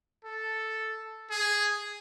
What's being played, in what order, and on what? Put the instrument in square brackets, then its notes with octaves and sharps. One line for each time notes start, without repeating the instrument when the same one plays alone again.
[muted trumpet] A4
G#4